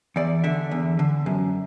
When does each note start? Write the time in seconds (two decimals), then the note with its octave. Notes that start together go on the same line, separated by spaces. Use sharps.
0.16 E2 D5
0.44 D3 E5
0.71 E2
0.99 D3
1.26 F#2